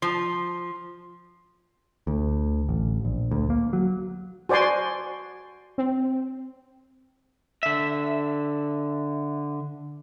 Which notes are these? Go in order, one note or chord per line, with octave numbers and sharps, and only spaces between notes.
F3 C6
D2
A1
A#1
D2
A#3
F#3
F#4 C5 D5 G#5 C6
C4
D3 E5